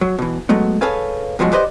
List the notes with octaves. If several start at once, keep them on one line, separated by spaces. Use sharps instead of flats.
F#3
B2 E3
F#3 G#3 A3 B3
G#4 A4 B4 C#5 F5 G#5
G2 B2 F3 F#3 G#3
G4 B4 C5 D5 D#5